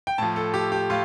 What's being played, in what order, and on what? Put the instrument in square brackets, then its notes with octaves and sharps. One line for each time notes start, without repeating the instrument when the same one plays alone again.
[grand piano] G5
A2 F3 A5
A4
G4
G4
A2 F4